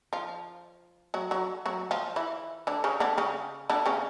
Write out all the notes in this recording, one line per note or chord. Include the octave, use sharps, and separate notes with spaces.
F3 F4
F#3 F#4
F#3 F#4
F#3 F#4
F3 F4
E3 E4
D3 D4
C#3 C#4
D3 D4
C#3 C#4
D3 D4
C#3 C#4